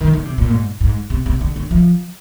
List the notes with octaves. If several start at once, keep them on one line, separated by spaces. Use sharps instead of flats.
D#3
D3
C3
A#2
G#2
G#2
C3
C3
D3
D3
F3